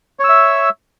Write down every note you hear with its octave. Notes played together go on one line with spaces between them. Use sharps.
C#5 E5 E6